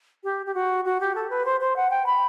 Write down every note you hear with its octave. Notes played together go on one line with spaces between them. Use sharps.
G4
G4
F#4
F#4
G4
A4
B4
C5
C5
F#5
G5
B5